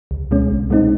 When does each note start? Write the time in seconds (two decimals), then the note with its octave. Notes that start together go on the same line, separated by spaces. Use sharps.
0.11 C#2
0.31 B2 G#3 C#4
0.51 C2
0.70 B2 G#3 C4 D#4